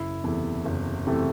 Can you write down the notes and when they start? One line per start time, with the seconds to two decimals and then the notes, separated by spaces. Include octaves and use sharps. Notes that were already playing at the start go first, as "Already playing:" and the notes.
Already playing: F#1 E4
0.24 E2 C3 E3 A3
0.65 F#1
1.07 C3 E3 A3